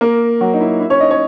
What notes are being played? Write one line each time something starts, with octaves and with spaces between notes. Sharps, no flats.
A#3 A#4
F#3 F#4
D#4
E4
E4
C#4 C#5
D#4 D#5
C#4 C#5